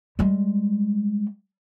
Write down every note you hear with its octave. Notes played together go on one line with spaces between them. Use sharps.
G3 G#3